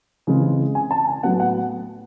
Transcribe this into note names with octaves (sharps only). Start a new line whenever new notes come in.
C#3 E3 G#3 C4
G#5
A5
G#5
A2 F#3 B3 F#5
F#5